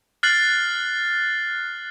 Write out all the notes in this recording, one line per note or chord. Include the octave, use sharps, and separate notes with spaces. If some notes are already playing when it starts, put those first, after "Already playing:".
F6 F#6 A6 C7 F#7